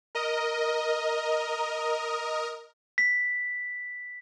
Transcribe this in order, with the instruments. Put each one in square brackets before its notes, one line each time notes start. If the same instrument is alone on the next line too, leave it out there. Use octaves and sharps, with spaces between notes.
[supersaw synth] A#4 D#5
[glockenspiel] B6